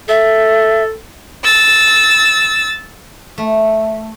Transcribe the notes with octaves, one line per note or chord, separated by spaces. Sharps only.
A4 E5
E6 A6
A3